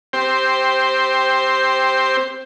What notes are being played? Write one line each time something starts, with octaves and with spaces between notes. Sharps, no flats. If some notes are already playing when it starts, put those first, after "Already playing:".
C4 G4 C5